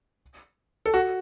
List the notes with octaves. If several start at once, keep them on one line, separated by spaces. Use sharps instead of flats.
A4
F#4